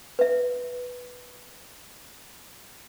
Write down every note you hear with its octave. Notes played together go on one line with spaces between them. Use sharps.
B4 E5